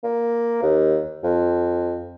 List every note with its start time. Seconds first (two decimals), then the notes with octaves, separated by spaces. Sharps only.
0.04 A#3
0.63 D#2
1.23 F2